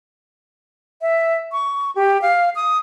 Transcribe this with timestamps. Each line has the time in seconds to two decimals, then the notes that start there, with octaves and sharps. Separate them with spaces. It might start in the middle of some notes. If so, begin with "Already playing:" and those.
1.02 E5
1.52 C#6
1.96 G4
2.22 F5
2.56 D#6